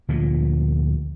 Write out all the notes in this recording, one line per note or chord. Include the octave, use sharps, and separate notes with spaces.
D2 A#2 F3